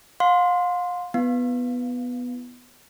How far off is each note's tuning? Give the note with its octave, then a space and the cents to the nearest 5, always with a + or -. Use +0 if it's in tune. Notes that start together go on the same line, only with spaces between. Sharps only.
F5 +35 C6 +0
B3 +0 E4 +30 F5 -5